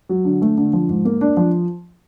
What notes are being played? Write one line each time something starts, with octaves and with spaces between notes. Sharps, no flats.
F#3
D3
A3
D3
F3
G#2
A#3
D4
F3